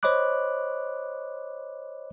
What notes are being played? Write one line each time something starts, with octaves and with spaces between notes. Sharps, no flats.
C5 C#5 D#5 B5 D6 F#6